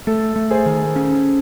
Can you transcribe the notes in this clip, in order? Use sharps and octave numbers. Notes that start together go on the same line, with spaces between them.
A3 A4
A3
G#4 C5
D#3
C#4